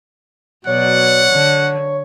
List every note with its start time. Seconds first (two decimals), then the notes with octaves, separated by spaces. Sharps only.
0.67 B2 F#3 C#5 D5 F#5
1.32 D3